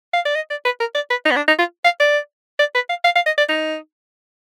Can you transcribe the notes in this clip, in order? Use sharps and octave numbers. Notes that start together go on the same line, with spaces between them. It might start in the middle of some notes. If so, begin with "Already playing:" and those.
F5
D5
D#5
D5
B4
A#4
D5
B4
D#4
B3
D4
D#4
F4
F5
D5
D5
B4
F5
F5
F5
D#5
D5
D#4